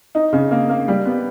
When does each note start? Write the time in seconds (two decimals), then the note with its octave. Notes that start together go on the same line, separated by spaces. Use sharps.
0.15 D#4
0.33 C#3
0.51 A#3
0.69 A#3
0.88 G3
1.05 B3